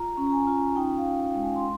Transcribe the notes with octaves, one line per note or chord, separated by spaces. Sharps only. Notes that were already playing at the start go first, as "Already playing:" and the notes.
Already playing: F4 A#5
C#4
A#5
G#5
F4
D#4 G5
F5
D#4
G5
G#3
G#5
C6